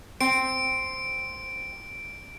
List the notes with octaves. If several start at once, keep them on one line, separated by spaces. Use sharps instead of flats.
C4 D7